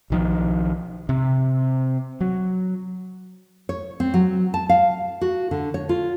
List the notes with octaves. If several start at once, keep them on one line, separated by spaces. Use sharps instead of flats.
B1 D#3 F3
C3
F#3
C#5
C4
F#3
A5
F5
F#4
D3
C#5
F4